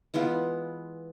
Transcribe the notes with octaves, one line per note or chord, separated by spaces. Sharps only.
E3 G#3 B3 F4